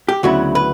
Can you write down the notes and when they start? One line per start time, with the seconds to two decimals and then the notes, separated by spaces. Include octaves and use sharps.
0.09 G4
0.23 D2 C#3 F#3 B3 E4 F#4
0.55 B4